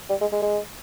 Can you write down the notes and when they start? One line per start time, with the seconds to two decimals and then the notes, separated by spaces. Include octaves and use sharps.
0.10 G3
0.21 G#3
0.32 G#3
0.42 G#3